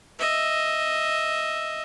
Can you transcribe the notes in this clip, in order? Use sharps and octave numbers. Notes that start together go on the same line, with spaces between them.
D#5 E5